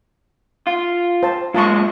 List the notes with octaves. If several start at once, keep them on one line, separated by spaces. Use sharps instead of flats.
F4
C5 A5
F#3 G#3 F4 A5 C6 C#6